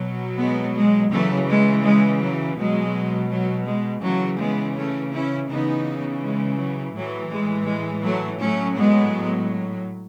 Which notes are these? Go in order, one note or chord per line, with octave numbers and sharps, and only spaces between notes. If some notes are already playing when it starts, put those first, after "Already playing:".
Already playing: B2 F#3
G#3 B3
G#3
C#3 E3 F#3 A3
G#3
G#3
F#3
B2 F#3 G#3
F#3
G#3
C#3 E3 F#3 A3
G#3 B3
A3 C#4
C#4 E4
C#3 E3 B3 D#4
G#3
F#3
A2 E3 F#3
G#3
G#3
F#3 A3
A2 F#3 A3 C#4
G#3 B3